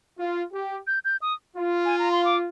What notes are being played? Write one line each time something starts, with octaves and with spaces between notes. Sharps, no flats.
F4
G4
G6
G6
D#6
F4
G#5
A#5
C6
D6